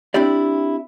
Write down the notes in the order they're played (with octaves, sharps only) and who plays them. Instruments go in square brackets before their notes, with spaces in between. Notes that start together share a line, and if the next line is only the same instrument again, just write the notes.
[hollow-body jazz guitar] C4 D4 E4 G4 D5